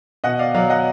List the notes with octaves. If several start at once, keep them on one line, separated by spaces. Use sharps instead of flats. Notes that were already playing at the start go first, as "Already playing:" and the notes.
B2 D#5 F#5
D5 F5
F#3 D5 F5
D#5 F#5